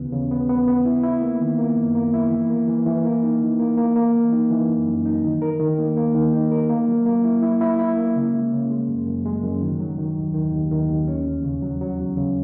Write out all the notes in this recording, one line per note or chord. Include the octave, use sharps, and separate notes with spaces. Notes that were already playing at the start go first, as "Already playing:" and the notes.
Already playing: D#2 C#3 E3 B3
C#3
B3
B3
B3
E4
E4
A#3
D#3
A#3
F#2
A#3
E4
E3
A#3
E3
E3
A#3
D#4
E3
A#3
A#3
A#3
E3
D#4
E3
F#2
F#2
D#4
D#3
A#4
D#3
A#3
A#3
D#3
D#4
A#4
A#3
F#3
A#3
E4
E4
E4
E4
A#3
C#3
G#3
C#3
G#3
F#2
F#2
G#3
F#2
D#3
F#3
D#3
D#2
D#3
D#2
D#3
D#2
C#4
E2
C#3
F#3
F#3
E2
C#3